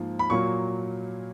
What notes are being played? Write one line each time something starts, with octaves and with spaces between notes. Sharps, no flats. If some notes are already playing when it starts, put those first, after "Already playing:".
Already playing: G#2 F3 A#3
B5
A#2 F#3 A#3 C#6